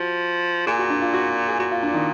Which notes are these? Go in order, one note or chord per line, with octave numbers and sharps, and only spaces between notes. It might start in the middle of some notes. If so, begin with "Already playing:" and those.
Already playing: F3 F#4
A#2 G#4
F#4
D4
F4
F#4
G#4
A#2 F#4
F4
D4
D#3